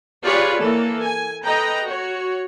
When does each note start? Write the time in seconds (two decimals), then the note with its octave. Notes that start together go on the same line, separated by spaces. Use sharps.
0.24 F4 G4 G#4 B4 C#5 D5
0.59 E3 A#3 A4
1.04 G#5
1.43 A4 B4 D#5 G5 A#5
1.85 F#4 C#5